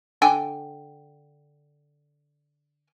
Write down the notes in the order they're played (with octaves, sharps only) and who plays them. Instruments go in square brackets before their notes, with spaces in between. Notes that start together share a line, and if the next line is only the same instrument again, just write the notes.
[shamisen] D3 G5 G#5